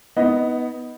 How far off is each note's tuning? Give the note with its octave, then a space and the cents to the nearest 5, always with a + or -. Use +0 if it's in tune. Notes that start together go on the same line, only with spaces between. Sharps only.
B3 +0 D#4 +30 D#5 +0